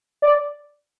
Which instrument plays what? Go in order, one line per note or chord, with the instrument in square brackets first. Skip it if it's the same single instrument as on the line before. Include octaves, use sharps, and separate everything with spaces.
[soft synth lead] D5